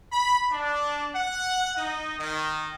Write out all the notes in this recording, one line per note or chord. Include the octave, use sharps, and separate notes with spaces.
B5
D4
F#5
D#4
D#3